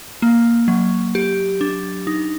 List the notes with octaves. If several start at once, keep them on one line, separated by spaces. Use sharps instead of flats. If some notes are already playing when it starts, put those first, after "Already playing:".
A#3
F#3
G4
D4
D#4